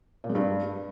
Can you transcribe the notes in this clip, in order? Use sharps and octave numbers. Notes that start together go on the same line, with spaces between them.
A#2
G#3
G2